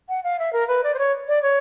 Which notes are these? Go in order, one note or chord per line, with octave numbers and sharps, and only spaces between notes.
F#5
F5
E5
A#4
B4
D5
C5
C#5
D5
C#5